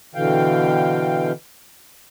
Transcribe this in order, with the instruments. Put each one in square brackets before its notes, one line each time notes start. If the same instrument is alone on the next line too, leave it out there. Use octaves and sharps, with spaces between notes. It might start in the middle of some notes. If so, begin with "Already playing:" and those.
[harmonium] B2 D3 E3 F5 G5